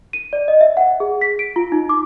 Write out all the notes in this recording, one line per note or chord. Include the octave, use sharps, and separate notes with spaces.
D#7
D5
D#5
E5
F#5
G#4
B6
D7
F4
D#4
D6